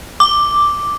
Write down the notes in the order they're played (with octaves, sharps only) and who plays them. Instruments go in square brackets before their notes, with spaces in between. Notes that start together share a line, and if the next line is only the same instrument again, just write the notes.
[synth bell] D6